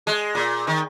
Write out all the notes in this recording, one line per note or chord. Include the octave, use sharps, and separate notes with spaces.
G#3
A#2
D#3